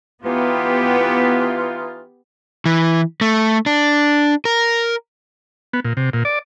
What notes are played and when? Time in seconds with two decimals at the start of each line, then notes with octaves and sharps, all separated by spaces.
0.24 E3 B3 D#4 F4 G4
2.65 E3
3.21 A3
3.66 D4
4.45 A#4
5.73 B3
5.84 A#2
5.97 C3
6.13 A#2
6.25 D5